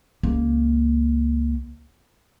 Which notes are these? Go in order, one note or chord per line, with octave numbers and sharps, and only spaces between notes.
C#2 A#3